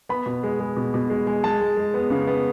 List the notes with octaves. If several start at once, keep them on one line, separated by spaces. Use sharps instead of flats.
B3 B5
B2
G#3
G#3
B2
B2
G#3
G#3
G#3 A5
G#3
G#3
B3
C#3
B3